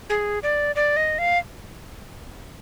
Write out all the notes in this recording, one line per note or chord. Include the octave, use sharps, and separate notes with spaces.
G#4
D5
D5
D#5
F5